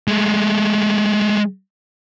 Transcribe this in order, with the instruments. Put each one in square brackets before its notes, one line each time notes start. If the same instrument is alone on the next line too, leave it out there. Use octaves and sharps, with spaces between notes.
[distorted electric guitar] G#3 A3